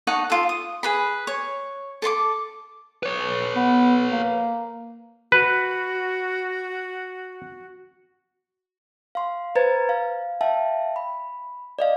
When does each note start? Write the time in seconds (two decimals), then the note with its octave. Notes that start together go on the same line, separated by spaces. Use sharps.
0.07 D#4 F#5 A5 C#6
0.30 F4 A4
0.49 D#6
0.83 G#4 B4 B5
1.27 C#5
2.02 A4 A5 C6 D6
3.03 B4 C#5
3.56 B3
4.11 A#3
5.32 F#4 B4
9.15 F5 C6
9.55 B4 C5 A#5 G#6 A6
9.89 F5
10.41 E5 F5 G5 A5
10.96 B5
11.79 D5 D#5 F5